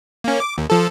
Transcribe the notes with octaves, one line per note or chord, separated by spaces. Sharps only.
A#3 C#4
D6
D#2
F3 A4